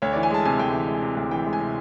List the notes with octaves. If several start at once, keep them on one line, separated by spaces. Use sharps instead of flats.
D2 C#5
E3 D5
G#5
G#3 A5
C3 G#5
D2 G5
E3
G#3
C3
D2
E3 G5
G#3
G#5
C3